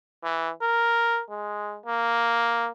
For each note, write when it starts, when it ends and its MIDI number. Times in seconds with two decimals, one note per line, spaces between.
0.24 0.50 52
0.62 1.21 70
1.30 1.78 56
1.86 2.69 58